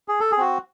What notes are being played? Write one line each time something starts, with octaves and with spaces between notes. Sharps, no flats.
G#4
A4
G#4
C4 F#4